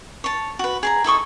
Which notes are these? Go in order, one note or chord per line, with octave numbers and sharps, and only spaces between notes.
C#5 A5
F#4 B4
G#4 A5 A#5
E4 A4 D#5 C#6